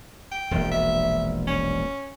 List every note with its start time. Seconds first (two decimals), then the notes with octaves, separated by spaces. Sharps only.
0.31 G5
0.51 E1 A#1
0.72 E5
1.47 C#4